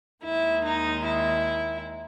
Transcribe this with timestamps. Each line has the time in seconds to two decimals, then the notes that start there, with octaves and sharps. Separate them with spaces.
0.22 D#2 D#3 G#3 E4
0.63 D#4
1.05 E4